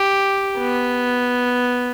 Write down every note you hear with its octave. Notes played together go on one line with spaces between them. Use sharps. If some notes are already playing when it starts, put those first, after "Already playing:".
Already playing: G4
B3